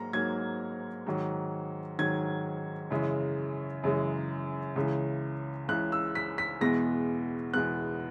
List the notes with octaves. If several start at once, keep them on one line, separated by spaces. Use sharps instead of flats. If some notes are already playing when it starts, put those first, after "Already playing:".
Already playing: G#2 F#3 A#3 A#5
G#2 F#3 A#3 G#6
G#2 D#3 F#3
G#2 D#3 F#3 G#6
F#2 C#3 E3 G#3
F#2 C#3 E3 G#3
C#2 C#3 E3
C#2 C#3 E3 F#6
E6
B6
B6
E2 B2 G#3 B3 A#6
E2 B2 G#3 B3 F#6